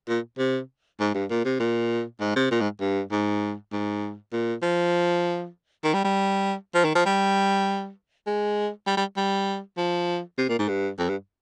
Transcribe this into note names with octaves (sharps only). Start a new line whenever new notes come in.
A#2
C3
G#2
G2
A#2
C3
A#2
G#2
C3
A#2
G#2
G2
G#2
G#2
A#2
F3
D#3
G3
G3
F3
D#3
F3
G3
G#3
G3
G3
G3
F3
C3
A#2
G#2
G2
F2
G2